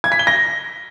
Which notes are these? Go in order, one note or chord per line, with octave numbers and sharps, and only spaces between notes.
G#6
B6
G7
A#6